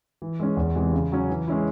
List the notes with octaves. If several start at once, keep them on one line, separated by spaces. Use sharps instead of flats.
E3
G#3 C#4
E2
C3 E3 G#3
C#3
F#3 C#4
E3
G#3 C#4 E4